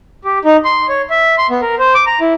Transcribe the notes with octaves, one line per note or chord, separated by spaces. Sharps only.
G4
D#4
C6
C#5
E5
C6
B3
A#4
C5
D6
A#5
E4